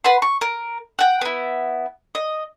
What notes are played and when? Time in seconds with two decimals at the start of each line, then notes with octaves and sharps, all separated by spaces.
0.04 B4 F#5 C6
0.22 C#6
0.41 A#4
0.99 F#5 G5
1.21 B3 E4
2.15 D#5